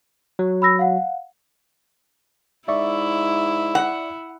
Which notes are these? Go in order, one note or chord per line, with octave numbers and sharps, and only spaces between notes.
F#3
B5 E6 A#6
F5 F#5
G#2 E4 D5 E5 C#6
F#5